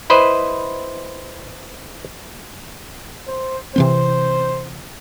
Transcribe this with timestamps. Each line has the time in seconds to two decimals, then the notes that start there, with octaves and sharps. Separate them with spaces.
0.10 E4 B4 C5 D#5
3.27 C5
3.76 C3 E3 C4 C5